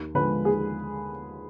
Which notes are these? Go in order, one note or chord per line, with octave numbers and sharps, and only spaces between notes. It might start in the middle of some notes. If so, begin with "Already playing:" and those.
Already playing: D#2
D3 F3 G#3 B4
D#2 G#4